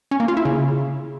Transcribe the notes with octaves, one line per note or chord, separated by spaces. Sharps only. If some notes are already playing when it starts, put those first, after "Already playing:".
C#4
A#3
F4
E4
C#3